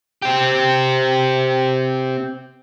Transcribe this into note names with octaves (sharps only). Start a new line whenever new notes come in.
C4 G4